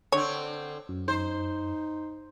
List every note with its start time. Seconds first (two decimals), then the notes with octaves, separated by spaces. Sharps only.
0.12 D3 C4 C#5
0.89 F#2
1.08 D#4 C5